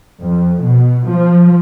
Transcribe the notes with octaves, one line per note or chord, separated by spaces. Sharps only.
F2
B2
F3